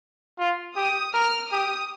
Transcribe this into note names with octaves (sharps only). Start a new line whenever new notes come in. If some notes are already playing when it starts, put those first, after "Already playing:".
F4
G4 D#6
A#4 F6
G4 D#6